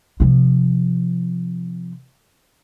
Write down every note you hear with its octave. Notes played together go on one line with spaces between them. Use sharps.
C3 F3